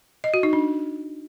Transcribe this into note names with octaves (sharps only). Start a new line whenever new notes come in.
D#5
F#4
D#4
D4